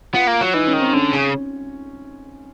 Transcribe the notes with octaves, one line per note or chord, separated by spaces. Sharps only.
B3 F4
A#3
F#3
E3 D#4
C#4
D#3
C4
D3 C#4
C#3